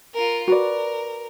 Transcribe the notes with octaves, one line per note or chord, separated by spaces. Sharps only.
F4 A#4
F#4 A#4 B4 D5